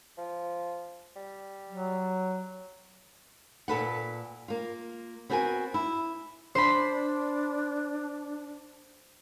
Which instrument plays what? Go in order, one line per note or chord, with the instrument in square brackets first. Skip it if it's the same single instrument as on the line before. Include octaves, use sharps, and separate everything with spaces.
[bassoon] F3
G3
[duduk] F#3
[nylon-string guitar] A#2 A4 B4 F#5
A#3 F4
B3 C4 F#4 A#4 G5 G#5
E4
[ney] D4 [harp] C5 B5